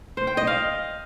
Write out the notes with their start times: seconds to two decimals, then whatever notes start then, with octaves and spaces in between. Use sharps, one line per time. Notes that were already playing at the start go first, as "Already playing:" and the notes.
0.17 C5
0.27 G5
0.37 D#5
0.47 F5